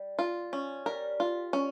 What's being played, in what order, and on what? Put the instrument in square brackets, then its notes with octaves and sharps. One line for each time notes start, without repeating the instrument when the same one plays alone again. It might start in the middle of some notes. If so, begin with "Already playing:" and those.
Already playing: [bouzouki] G3
[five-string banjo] F4
C#4
[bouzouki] G3 [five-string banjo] A#4
[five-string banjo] F4
C#4